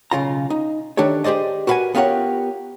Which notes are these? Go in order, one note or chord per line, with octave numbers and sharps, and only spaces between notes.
B1 C#3 F4 A#5
D#4
D#3 D4 G4 A4 C#5
G4 G#4 C5 D5 D#5
F#4 A#4 B4 E5 F#5 G#5
B3 F4 G4 A#4 C#5 F#5